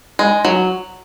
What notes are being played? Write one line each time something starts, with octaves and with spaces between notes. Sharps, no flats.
G#3
F#3